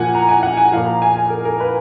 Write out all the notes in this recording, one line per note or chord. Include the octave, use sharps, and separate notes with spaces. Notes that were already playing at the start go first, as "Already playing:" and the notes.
Already playing: A#2 F3 F#5 G#5
A#5
G#5
F#5
G#5
A#2 F3 F5
A#5
G#5
G#5
A#4
A#4
B4